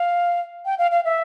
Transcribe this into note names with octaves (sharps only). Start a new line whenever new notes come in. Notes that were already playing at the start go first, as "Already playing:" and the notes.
Already playing: F5
G5
F5
F5
E5